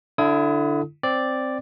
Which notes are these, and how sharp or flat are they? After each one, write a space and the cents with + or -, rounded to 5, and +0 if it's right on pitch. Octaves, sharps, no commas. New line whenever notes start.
D3 +0 E4 +20 D#6 +30
C4 +0 D5 +0